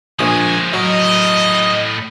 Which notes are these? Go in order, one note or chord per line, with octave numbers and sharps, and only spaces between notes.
A#1 F3 G#3 G#5 D#6
A2 F#3 A#4 D#5